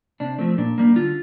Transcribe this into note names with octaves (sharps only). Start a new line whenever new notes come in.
C3 D4
F3 A3 C4
A#2 D4
G3 A#3
D3 F4